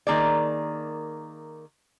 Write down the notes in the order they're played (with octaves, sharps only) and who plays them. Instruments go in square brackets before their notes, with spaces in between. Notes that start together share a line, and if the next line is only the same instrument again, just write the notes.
[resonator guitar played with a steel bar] D#3 A#3 G#4 D5